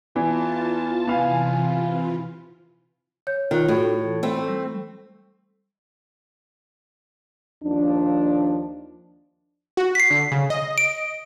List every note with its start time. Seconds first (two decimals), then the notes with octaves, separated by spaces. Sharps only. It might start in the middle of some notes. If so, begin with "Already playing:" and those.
0.16 E2 E3 F4 A5
1.07 C3 E3 B3 F4 F5 G#5
3.27 C#5 G6
3.51 D#3 F4 C#5 F#6
3.68 A2 F#4 G#4 A4
4.04 E3
4.23 A3 C4
4.48 G3
7.64 D#2 F3 D4
9.77 F#4
9.95 B6 C7
10.10 D3
10.32 C#3
10.50 D#5
10.78 D7